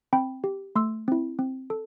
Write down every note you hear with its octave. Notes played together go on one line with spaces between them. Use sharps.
C4 G5 B5
G4
A3 C6 E6
C4 E4
C4
A4